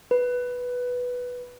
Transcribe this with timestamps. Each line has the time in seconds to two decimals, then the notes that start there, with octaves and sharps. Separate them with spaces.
0.11 B4